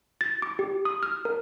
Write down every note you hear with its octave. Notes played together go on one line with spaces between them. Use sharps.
A6
D6
G4
D#6
F6
A#4